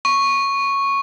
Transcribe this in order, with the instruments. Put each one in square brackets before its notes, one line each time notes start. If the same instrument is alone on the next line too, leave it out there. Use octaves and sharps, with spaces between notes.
[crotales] C#6